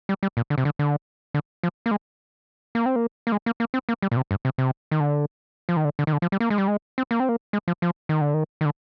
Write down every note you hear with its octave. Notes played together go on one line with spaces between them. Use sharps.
G3
G3
A#2
D3
C3
D3
D3
D3
F3
A#3
G#3
A#3
C4
A#3
A#3
G#3
A#3
A#3
C4
A#3
G3
A#2
C3
G2
C3
C3
D#3
D3
F3
D#3
D3
D3
D#3
D3
F3
G3
A#3
G#3
G3
G#3
C4
A#3
C4
A#3
G#3
F3
F3
D#3
D3
D#3
D#3
D3